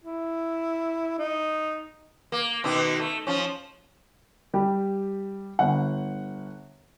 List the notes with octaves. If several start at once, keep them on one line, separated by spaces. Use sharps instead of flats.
E4
D#4
A#3
B2 D#3 D#4
A3
F3 C#4
G3 G4
G1 F#5